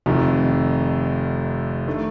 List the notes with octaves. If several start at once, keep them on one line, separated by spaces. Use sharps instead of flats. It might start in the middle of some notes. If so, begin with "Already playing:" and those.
F1 F2 D#3
D#3 A3 D4